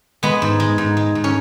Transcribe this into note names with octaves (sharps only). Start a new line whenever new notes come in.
G#3 B3
G#2
G#3
G#2
G#3
G#2
C#4